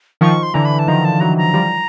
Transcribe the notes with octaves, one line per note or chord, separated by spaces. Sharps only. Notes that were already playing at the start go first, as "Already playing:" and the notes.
D#3 F3 C#6
C6
D3 E3 A#5
B5
A5
D#3 F3 A#5
A5
E3 F#3 A#5
A#5
F3 G3